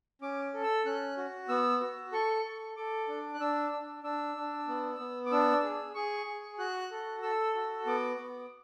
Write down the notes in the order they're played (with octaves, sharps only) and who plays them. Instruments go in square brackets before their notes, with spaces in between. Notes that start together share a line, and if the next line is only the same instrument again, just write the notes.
[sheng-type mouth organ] C#4 D6
A4
E6
C#4 F#6
F#4
B3 E6
F#4
A4 C#6
A4
A4 D6
D4
F#6
D4 E6
D4
D4 E6
D4
B3
B3
D6
D4 E6
G#4
G#4 C#6
G#4
F#4 F#6
A4
A4 E6
F#4
B3 D6
B3